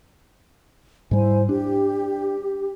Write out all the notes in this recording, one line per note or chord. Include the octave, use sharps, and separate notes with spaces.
G#2 G3 E4 C5 G#5
D4 G4